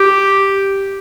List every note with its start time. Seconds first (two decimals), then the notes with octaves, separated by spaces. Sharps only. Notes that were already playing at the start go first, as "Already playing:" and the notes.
Already playing: G4